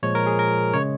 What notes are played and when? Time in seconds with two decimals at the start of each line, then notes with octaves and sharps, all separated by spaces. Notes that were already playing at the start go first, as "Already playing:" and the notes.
0.03 A#2 F3 G#3 C#5
0.15 A#4
0.26 G#4
0.39 A#4
0.74 C#3 G#3 C#5